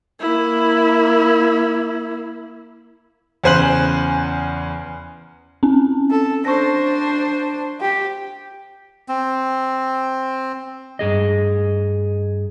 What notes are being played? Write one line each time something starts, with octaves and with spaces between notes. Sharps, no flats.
A#3 E4
E2 C#3 C5 G#5 F#6 F#7
C4 C#4
A4
D4 C5 C#6 A#6
G4
C4
G2 G#4 D#5